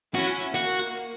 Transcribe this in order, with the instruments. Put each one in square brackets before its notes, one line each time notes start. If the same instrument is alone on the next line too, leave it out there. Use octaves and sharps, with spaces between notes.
[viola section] C#4 E4 [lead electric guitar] F#4
[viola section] A#3 [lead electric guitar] F#4